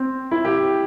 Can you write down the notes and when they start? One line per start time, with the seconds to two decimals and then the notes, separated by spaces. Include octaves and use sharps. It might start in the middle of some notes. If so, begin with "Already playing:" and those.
Already playing: C4
0.31 E4
0.45 G4